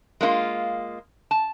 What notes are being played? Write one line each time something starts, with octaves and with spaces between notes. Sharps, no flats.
G#3 A#3 D#4 F4
A5